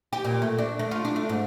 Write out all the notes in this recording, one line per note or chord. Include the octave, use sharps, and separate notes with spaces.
G4
A#2
A3
D4
A3
F4
D4
A3
G#2